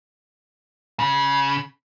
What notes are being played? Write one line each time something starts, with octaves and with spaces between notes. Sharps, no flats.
C#3